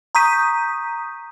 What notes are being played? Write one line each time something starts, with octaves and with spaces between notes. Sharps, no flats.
A#5 C#6 D#6 G6 B6 D#7